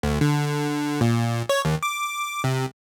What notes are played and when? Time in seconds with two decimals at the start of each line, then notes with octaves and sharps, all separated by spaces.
0.03 D2
0.21 D3
1.01 A#2
1.49 C#5
1.65 D#2
1.83 D6
2.44 C3